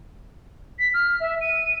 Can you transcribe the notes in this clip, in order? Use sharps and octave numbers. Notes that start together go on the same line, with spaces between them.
B6
F6
E5
D#7